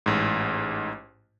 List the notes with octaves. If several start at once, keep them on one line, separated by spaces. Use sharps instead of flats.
A1 G#2